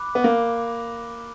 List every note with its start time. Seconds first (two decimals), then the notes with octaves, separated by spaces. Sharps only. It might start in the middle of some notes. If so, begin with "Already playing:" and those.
Already playing: B5 D6 F#6
0.15 B3
0.24 A#3